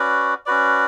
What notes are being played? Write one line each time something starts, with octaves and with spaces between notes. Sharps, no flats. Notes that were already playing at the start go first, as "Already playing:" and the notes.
Already playing: C#4 F#4 B4 D5
C#4 F#4 B4 D5